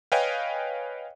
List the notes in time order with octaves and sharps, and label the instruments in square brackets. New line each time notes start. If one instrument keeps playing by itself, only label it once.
[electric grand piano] B4 C#5 D#5 F5 G5 G#5